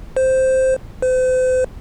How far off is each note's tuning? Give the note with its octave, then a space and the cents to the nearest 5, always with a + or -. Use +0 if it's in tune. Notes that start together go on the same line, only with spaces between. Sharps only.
C5 +0
C5 -40